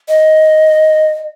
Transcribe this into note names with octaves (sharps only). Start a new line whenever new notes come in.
D#5